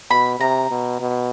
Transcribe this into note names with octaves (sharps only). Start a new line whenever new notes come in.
B2 B5
C3 A#5
B2
B2